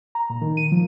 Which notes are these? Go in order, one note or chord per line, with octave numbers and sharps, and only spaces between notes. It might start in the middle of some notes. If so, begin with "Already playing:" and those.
A#5
A#2
D#3
D#7
F3